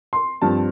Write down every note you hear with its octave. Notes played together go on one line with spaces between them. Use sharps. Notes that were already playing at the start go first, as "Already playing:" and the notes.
C6
G2 F3 C4 A5